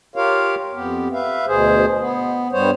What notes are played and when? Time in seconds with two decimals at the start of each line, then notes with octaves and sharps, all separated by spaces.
0.16 F4 G4 A#4 C#5 F5
0.73 F2 B3 G4
1.13 B4 E5 F5
1.47 D2 B2 G#4 C5
1.98 B3
2.52 G2 G3 B3 C5 C#5